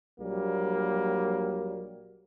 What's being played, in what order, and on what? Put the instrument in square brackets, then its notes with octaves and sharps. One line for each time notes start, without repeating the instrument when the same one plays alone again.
[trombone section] A#1 F#3 G3 A#3